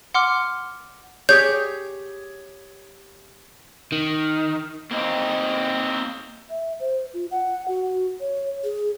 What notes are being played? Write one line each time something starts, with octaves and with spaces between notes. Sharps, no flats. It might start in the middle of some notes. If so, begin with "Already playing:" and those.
F#5 C6 D6 F6
G4 G#4 C#5 G6
D#3
A#3 C4 D#4
E5
C5
F4
F#5
F#4
C#5
G#4